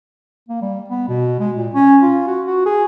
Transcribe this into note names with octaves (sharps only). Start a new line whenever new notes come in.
A#3
G3
B3
B2
G#3
A#2
C#4
F4
F#4
F#4
G#4